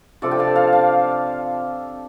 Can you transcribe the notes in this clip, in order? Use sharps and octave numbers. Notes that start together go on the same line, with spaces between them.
C3 F3 D4 F4 A4 D5
G5
F5 A5
F5 A5
F5 A5